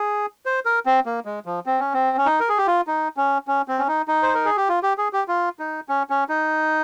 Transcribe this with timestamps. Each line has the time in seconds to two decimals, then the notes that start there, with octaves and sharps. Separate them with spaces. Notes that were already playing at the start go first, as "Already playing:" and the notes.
Already playing: G#4
0.46 C5
0.65 A#4
0.86 C4
1.06 A#3
1.25 G#3
1.46 F3
1.66 C4
1.80 C#4
1.94 C4
2.17 C#4
2.26 D#4
2.40 A#4
2.49 G#4
2.58 G4
2.67 F4
2.87 D#4
3.17 C#4
3.48 C#4
3.68 C4
3.79 C#4
3.88 D#4
4.08 D#4
4.23 C5
4.34 A#4
4.45 G#4
4.57 G4
4.69 F4
4.83 G4
4.98 G#4
5.13 G4
5.28 F4
5.59 D#4
5.89 C#4
6.10 C#4
6.29 D#4